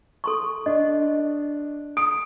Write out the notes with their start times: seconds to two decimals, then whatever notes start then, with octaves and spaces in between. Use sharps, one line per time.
0.24 A4 C6 C#6
0.66 D4 D#5
1.97 D#6 D7